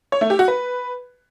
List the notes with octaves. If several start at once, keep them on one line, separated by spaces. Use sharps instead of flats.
C#5
A3
G4
F#4
B4